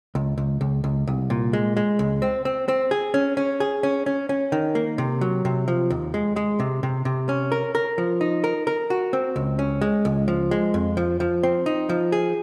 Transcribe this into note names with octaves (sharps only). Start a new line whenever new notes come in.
C#2
C#2
C#2
C#2
C2
A#2
G#3
G#3
C#2
C4
C4
C4
G#4
C#4
C#4
G#4
C#4
C#4
C#4
D#3
A#3
C3
F#3
C3
F3
D#2
G#3
G#3
C3
C3
C3
C#4
A#4
A#4
F3
D#4
A#4
A#4
F#4
C4
C#2
C#4
G#3
C#2
F3
G#3
F2
F3
F3
C4
D#4
F3
G#4